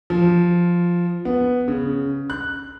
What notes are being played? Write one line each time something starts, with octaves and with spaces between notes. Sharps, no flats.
F3
B3
C#3
F#6